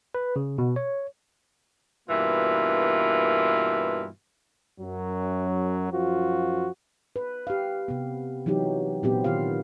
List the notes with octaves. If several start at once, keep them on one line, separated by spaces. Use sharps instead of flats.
B4
C#3
B2
C#5
G2 B2 E3 A#3 F4
F#2 F#3
F#2 F3 F4 F#4
B4
G4 F5
C3 B3
E3 F#3 D#4 G4
A#2 F#3 B3 C4 G4
D#3 F4 G4 F5